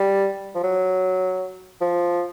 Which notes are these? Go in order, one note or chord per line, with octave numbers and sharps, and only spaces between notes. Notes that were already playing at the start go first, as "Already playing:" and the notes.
Already playing: G3
F3
F#3
F3